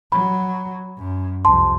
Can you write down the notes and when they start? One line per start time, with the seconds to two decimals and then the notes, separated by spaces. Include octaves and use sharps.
0.12 F#3 B5
0.98 F#2
1.45 C2 F2 A5 C6